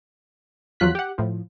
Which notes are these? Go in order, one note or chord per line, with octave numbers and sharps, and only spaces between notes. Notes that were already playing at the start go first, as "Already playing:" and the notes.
E2 F3 F#3 F4 F#6 B6
G4 F#5
A2 F3